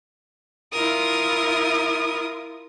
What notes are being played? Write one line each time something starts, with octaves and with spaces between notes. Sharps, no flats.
E4 F4 A#4 D#6